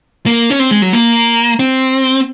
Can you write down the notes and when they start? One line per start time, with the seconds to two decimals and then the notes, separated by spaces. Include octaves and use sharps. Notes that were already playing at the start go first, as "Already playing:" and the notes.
0.26 A#3
0.50 C#4
0.59 C4
0.71 G#3
0.82 F#3
0.93 A#3
1.59 C4